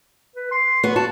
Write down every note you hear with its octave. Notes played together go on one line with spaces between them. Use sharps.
B4
C6
B3 F#4
F#4 A5